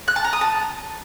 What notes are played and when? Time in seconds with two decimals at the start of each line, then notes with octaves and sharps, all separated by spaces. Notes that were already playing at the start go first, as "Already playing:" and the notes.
0.08 F#6
0.16 A5
0.24 A#5
0.33 D#6
0.41 A5